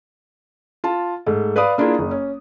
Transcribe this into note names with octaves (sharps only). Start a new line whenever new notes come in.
F4 A5
G#2 A3
B4 D5 F5 B5 D#6
A#3 D4 E4 F4 G#4
F#1
C#4